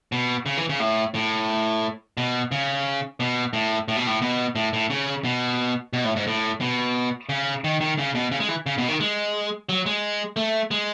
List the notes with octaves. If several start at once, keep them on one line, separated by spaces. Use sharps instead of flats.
B2
C#3
E3
C#3
A2
A2
B2
C#3
B2
A2
A2
B2
A2
B2
A2
A2
C#3
B2
B2
A2
G#2
A2
B2
C#3
D#3
D#3
C#3
B2
C#3
G#3
E3
C#3
B2
D#3
G#3
F#3
G#3
A3
G#3